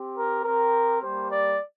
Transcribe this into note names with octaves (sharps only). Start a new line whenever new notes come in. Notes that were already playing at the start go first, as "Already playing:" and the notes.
Already playing: C4 G4
A#4
C4 G4 A#4
G3 A#3 G4 C5
D5